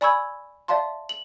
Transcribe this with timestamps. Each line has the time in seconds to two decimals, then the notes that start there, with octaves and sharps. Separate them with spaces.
0.01 D5 G#5 B5 C#6 E6 G#6
0.68 D5 E5 F5 A5 C6
1.09 F#7